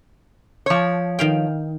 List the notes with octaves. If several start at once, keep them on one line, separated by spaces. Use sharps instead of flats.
F3 C#5
D#3 F5 G5